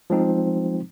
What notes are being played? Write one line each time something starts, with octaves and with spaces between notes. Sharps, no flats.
F3 G#3 C4 D#4